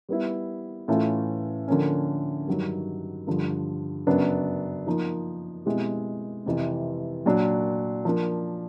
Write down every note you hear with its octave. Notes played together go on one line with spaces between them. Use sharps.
G3 B3 E4
A2 E3 A3 C#4 F4
D3 F3 A#3 C#4
G2 D#3 F#3
G2 D3 F3
F#2 C#3 F#3 B3 D4
F3 A#3 D#4
B2 G#3 C4 E4 G4
F2 C3 E3
A#2 F#3 A#3 D4 F#4
F3 A#3 D4